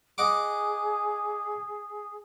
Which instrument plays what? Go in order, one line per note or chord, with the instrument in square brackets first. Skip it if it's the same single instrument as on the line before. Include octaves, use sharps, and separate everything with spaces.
[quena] G#4 [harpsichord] D#5 F#5 D6